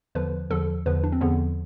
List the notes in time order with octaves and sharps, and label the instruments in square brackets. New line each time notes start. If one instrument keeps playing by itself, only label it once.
[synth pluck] E2 D3 F3 B4
E2 D3 F3 A4
E2 D3 F3 B4
D4
C4
E2 D3 F3 B3